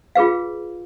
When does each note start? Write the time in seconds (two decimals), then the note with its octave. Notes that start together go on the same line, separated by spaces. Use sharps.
0.15 F4 G#4 B4 F5